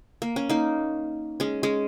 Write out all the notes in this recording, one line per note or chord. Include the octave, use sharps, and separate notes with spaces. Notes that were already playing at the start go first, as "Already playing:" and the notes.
A#3
C#4
A#3 D#4
G#3 C#4
G#3 C#4